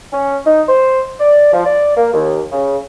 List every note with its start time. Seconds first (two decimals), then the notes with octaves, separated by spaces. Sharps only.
0.13 C#4
0.46 D#4
0.69 C5
1.20 D5
1.53 F3
1.66 D5
1.97 A#3
2.14 D#2
2.52 C#3